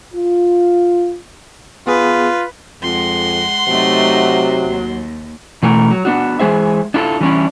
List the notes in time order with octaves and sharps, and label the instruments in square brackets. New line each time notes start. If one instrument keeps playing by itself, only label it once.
[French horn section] F4
[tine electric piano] B3 G#4 [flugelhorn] F4 [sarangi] B4
[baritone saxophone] F2 [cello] G#3 [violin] F#5 C6
[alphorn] C3 [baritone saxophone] F#3 [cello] A3 D#4
[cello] D#2
[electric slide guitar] B2 E3 A3 A#4
F#3
B3 D4 F#4
E3 G#3 G#4 C5 E5
D4 E4 F4 A4
E3 G3 C#4 D4 E4